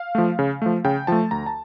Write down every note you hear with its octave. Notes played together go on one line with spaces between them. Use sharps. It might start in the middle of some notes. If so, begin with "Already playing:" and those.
Already playing: F5
F3 A3
C#3
F3 A3
C#3 G5
F3 A3 A5
D2 A#5
A5